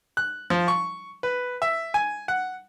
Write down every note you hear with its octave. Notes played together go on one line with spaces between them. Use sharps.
F#6
F3
C#6
B4
E5
G#5
F#5